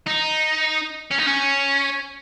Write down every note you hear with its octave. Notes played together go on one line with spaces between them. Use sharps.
D#4
C#4
D#4
C#4